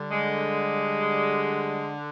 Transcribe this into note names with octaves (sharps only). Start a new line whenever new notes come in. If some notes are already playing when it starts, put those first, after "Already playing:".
Already playing: D3 G3
G#3